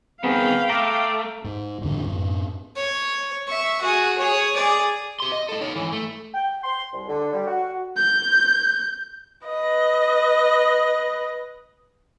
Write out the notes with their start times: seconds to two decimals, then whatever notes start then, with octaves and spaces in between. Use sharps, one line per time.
0.24 C2 D#3 B3 C4 G#4 F5 G5 B5
0.69 A3 A#5 D6
1.44 G#2
1.81 A1 F2 D3 D4
2.06 F#2 A2
2.76 C#5
3.48 E5 C#6
3.81 F#4 G#4
4.18 G#4 C#5
4.57 G#4 D5
5.20 G4 C6
5.32 D#5
5.49 A2 A4
5.61 D#4 C#5
5.76 G#2 E3
5.93 A3
6.34 G5
6.63 C6
6.93 C2
7.08 D3
7.33 G3
7.47 F#4
7.97 G6
9.47 B4 D#5